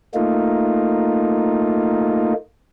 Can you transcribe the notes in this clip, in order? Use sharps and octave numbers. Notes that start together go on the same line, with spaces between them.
A3 A#3 D#4 F4